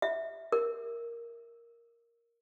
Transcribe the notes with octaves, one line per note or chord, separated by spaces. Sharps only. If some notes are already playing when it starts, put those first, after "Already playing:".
E5
A#4